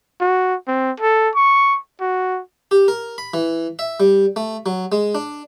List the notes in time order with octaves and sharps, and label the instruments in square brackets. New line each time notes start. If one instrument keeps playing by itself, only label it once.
[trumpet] F#4
C4
A4
C#6
F#4
[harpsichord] G4
A#4
B5
E3
E5
G3
A3
F#3
G#3
D4